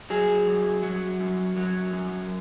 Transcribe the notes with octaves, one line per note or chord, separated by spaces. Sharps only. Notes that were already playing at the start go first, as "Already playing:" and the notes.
F#3 G#4
F#2
F#3
F#2
F#3
F#2